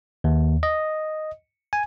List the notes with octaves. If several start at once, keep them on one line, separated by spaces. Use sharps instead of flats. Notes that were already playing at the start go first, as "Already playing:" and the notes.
D#2
D#5
G#5